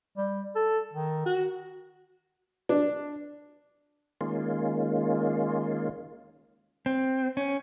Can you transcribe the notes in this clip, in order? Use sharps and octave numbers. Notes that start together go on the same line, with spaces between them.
G3
A4
D#3
F#4
D4
D#3 G#3 A#3 C#4 F4
C4
C#4